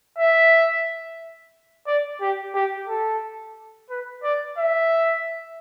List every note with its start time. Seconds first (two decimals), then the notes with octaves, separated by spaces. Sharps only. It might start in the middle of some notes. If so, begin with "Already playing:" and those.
0.18 E5
1.87 D5
2.21 G4
2.55 G4
2.88 A4
3.90 B4
4.23 D5
4.58 E5